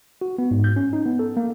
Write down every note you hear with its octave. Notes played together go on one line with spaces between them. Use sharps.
F#4
B3
G#2
G6
C#4
D#4
B3
A4
A#3